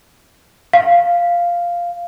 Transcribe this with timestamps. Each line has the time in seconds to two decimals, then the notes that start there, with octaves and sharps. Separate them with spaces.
0.73 F5